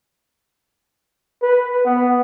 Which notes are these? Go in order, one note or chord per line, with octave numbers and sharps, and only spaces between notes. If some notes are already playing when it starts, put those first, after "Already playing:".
B4
B3